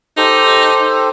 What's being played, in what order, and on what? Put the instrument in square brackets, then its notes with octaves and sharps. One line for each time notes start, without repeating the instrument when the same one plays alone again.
[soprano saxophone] D#4 [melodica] G4 A4 C5